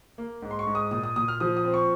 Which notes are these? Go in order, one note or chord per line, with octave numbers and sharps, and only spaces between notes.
A#3
G#2
C6
C#6
G#2
D#6
A#2 D#6
D#6
A#2 D#6
F6
F3 D#6
D#6
C4
C#6